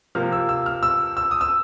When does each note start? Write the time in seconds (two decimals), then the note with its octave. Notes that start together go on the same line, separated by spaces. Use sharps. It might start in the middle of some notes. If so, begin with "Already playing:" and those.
0.15 C3 F3 A#3 F6
0.32 E6
0.49 E6
0.66 F6
0.83 E6
1.17 E6
1.31 D#6
1.41 E6